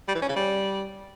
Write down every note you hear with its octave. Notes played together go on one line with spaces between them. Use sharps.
G3
E3
C#4
C#3
G3